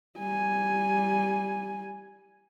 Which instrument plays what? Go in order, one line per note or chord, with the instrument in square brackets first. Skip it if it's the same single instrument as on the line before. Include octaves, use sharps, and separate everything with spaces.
[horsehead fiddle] G3 G#5